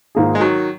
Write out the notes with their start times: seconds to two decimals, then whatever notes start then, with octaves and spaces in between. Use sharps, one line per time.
0.15 G#2 D#3 A#3 F4 G#4
0.35 G#3
0.40 D#3 F#3